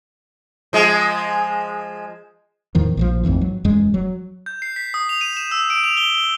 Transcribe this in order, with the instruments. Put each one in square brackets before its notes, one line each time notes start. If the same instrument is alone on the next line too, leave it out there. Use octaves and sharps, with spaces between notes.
[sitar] F3 G#3
[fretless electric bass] E2 A2 D#3 F3
A#1 D#3 F3
A1 F2 G#2 E3
F#3
E1 F#2 G#3
F#3
[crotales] G6
C7
B6
D#6
F7
D#7
E7
E6
D7
F7
G7
G7